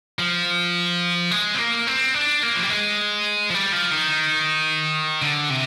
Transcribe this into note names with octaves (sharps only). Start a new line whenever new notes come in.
F3
G#3
C4
A#3
C4
D4
A#3
F3
G3
G#3
F3
G3
F3
D#3
D3
C3